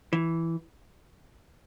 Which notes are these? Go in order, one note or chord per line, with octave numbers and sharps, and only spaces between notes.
E3